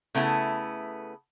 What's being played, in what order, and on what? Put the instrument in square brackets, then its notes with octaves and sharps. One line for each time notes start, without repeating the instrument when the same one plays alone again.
[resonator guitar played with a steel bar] C#3 A3 B3 D#4 E4